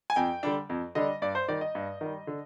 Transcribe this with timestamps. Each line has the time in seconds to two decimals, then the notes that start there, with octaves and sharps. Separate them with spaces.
0.10 G#5
0.16 F2 G5
0.43 D3 G3 D4
0.69 F2
0.95 D3 G3 D4 D#5
1.22 G2 D5
1.35 C5
1.48 D#3 G3 D5
1.61 D#5
1.75 G2
2.01 D#3 G3
2.27 D3